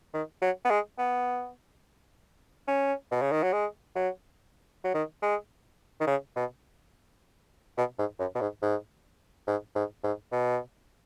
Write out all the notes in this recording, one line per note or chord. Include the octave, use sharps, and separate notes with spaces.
D#3
F#3
B3
G#3
B3
C#4
B2
C#3
D#3
F#3
G#3
F#3
F#3
D#3
G#3
D#3
C#3
B2
B2
G#2
F#2
B2
G#2
G#2
G#2
G#2
G#2
B2